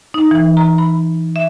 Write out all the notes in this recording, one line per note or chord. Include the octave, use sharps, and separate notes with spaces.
D#4
E3
A#5
B5
E5